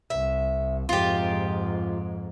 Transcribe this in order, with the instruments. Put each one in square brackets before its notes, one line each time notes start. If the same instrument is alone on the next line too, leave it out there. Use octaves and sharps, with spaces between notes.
[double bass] C2 [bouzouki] E5
[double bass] F2 G#2 [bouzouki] F4 G4